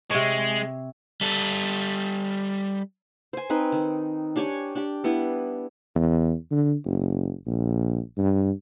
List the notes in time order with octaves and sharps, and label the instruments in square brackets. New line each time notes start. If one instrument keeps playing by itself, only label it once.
[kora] C3 C#5 [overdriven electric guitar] G#3
[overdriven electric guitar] G3 A4
[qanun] C5 G#5
C4 D#4 B4
D#3
D4 G4 C#5 G#5
D4 G4
G3 B3 E4
[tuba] E2
D3
F#1
A#1
G2